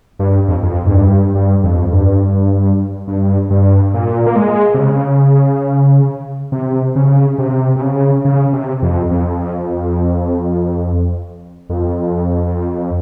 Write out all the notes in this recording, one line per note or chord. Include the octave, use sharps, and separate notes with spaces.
G2
F2
F2
G#2
G2
G2
F2
G2
G2
G2
A#2
A#3
G#3
C3
C#3
C3
C#3
C3
C3
C#3
C#3
C3
F2
F2
F2